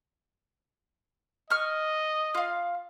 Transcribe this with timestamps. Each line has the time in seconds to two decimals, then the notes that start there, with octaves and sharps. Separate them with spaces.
1.50 D#5 C#6 F6
2.35 F4 F5